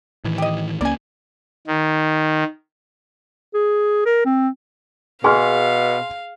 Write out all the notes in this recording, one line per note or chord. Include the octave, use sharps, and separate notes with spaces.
A2 D#3 E3
G4 D#5
C#2 A#3 C#4 D5 G#5
D#3
G#4
A#4
C4
B2 G#4 F5 G#5 C6 F6